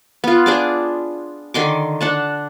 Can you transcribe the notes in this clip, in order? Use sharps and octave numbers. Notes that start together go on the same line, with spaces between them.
B3 F4
D4 G#4 D6
D3 D#3 C6 D6
D4 F#5 A5